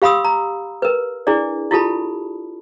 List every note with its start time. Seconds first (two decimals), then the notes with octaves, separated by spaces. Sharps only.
0.02 G4 F5 B5 C6 D#6 E6
0.24 A#5
0.82 A#4 B4
1.27 D4 E4 G#4 D5
1.71 E4 F4 G4 A4 A5 B5